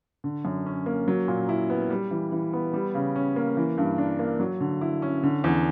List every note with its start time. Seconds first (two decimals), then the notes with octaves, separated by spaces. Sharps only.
0.24 D3
0.45 F#2
0.66 C#4
0.86 A#3
1.08 F#3
1.28 A#2
1.49 E4
1.70 B3
1.90 G3
2.11 E3
2.32 E3
2.53 B3
2.73 G3
2.94 C#3
3.16 C#4
3.36 A#3
3.57 E3
3.78 G2
3.98 D4
4.19 A#3
4.40 F#3
4.61 D3
4.81 E4
5.02 C#4
5.23 D3
5.44 E2